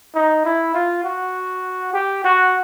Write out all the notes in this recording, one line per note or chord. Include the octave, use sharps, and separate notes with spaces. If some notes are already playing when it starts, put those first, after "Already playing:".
D#4
E4
F4
F#4
G4
F#4